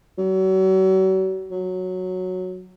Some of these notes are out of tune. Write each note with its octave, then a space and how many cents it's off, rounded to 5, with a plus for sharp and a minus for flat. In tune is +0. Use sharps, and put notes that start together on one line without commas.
F#3 +40
F#3 -10